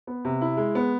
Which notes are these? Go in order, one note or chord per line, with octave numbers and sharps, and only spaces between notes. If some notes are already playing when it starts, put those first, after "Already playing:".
B3
C3
E4
G#3
B3